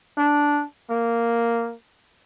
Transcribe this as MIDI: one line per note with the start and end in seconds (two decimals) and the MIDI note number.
0.17 0.63 62
0.90 1.74 58